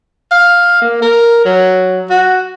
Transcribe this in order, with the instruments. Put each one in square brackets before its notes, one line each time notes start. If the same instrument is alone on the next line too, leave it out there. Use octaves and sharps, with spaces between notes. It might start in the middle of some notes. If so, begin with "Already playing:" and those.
[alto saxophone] F5
A#3
A#4
F#3
F#4